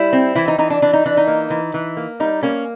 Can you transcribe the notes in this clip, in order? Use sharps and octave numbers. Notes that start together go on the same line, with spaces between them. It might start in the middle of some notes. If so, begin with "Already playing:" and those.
Already playing: G3 E4
C4
E3 E4
D#4
E3 D#4
D4
E3 D4
D#4
E3 D4
D#4
A#3
E3
E3
A#3
G3 D#4
A#3 C#4